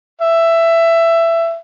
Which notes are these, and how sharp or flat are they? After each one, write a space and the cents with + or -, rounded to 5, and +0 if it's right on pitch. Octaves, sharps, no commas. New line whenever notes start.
E5 +15